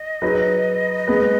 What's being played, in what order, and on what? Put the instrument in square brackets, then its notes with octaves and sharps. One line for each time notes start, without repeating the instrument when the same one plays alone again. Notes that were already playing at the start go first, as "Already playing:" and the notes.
Already playing: [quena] D#5
[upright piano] F#3 D#4 G#4 B4
G#3 B3 G#4 B4